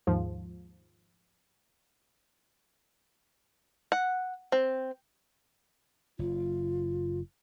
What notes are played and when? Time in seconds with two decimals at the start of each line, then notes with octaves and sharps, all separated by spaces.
0.07 D#2 G#2 F3
3.92 F#5
4.52 C4
6.19 F#1 F4